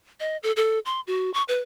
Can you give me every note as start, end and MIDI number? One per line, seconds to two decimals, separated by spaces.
0.20 0.37 75
0.43 0.52 69
0.56 0.79 69
0.85 1.01 84
1.07 1.31 66
1.34 1.43 85
1.48 1.60 71